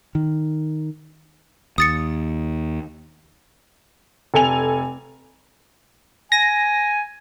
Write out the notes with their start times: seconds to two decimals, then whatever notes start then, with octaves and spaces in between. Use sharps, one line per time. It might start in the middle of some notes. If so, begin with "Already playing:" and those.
0.15 D#3
1.78 D#2 D#6 A6 C#7
4.34 F1 A4 G#5 F7
6.32 G#5 A#6